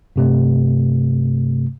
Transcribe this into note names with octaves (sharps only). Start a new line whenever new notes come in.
G2 C3 A3